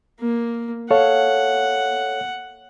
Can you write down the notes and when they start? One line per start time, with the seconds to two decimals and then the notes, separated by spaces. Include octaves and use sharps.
0.20 A#3
0.91 A4 C#5 F5 F#5